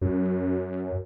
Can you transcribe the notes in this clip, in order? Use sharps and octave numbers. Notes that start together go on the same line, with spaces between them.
F#2